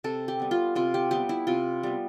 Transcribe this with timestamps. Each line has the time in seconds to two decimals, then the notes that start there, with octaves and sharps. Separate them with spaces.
0.04 C3 A4
0.28 G4
0.40 G3 B3
0.51 F4
0.75 C3 F4
0.94 G4
1.11 G3 B3 G4
1.29 E4
1.47 C3 F4
1.83 G3 B3